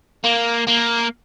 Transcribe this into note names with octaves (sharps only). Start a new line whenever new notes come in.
A#3
A#3